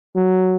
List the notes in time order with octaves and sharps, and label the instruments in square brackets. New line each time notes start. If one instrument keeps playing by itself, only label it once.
[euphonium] F#3